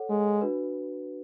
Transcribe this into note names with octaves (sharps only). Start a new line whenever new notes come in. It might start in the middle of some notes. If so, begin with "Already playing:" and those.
Already playing: A4 C#5 F#5
G#3
D4 F#4 B4